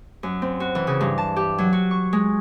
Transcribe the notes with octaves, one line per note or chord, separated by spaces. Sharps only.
F#2
C4
F#4
E3
C#3
G2
A5
G4
F#3
F#4
C#6
G#3